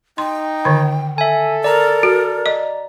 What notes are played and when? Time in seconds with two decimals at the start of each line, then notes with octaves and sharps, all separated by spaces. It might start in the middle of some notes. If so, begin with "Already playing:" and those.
0.18 D#4 G5 C6
0.65 D3 D#3
1.18 A4 E5 G#5
1.64 A#4 D5 A#5
2.03 F#4
2.46 D#5